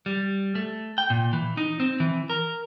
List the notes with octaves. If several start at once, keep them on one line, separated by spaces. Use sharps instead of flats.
G3
A3
G5
A#2
E3
D#4
C4
E3
A#4